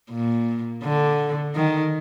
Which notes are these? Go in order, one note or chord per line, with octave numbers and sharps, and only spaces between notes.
A#2
D3
D#3